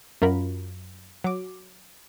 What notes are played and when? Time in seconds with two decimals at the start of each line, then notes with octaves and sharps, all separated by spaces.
0.22 F#2 F4 A#4 B5
1.24 F#3 D6